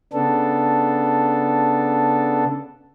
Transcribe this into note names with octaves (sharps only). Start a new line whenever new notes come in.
C#3 B3 D4 A4